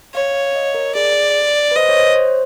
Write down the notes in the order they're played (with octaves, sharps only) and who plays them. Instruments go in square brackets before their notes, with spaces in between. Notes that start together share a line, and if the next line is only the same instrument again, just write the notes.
[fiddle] C#5 [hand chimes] F5
[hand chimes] F5
D#5
A#4
[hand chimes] G#4 [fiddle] D5
[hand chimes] B4
[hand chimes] C5 [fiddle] D#5
[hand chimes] C#5
C5
C#5
C5